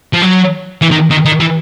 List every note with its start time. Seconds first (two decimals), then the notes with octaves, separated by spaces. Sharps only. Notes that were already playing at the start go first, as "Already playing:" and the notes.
0.14 F3
0.23 F#3
0.82 E3
0.91 D#3
1.11 D#3
1.25 D#3
1.40 E3